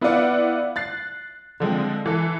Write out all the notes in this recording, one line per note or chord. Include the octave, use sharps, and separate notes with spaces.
B3 E4 F4 B4 D5 F#5
F#6 A6 C7
D3 F3 G#3 C4
E3 A4